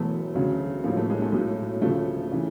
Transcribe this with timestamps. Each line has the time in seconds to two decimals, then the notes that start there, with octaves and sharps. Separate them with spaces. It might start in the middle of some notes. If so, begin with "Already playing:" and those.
Already playing: E1 E2 B2 F#3 A3
0.35 D2 C#3 F#3
0.84 A#1 A2 F#3 A#3
0.97 A3
1.10 G#3
1.22 A3
1.32 B1 A2 F#3
1.81 D2 C#3 F3 A3
2.32 C#3 E3